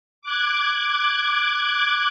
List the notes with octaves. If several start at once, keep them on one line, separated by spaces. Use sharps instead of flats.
D6 F#6 G#6